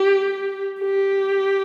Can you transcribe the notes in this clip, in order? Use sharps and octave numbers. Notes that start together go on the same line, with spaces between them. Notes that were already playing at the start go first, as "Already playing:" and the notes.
Already playing: G4
G4